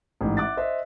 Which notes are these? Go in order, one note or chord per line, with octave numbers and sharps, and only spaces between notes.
A1 G#2
E5 F#5 D6 F#6 A6
C5 D#5 E5